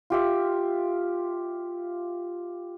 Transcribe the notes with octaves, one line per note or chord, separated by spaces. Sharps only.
F4 G4 E5